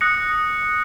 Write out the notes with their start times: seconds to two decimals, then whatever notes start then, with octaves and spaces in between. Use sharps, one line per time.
0.01 D#6 F#6 A#6 C#7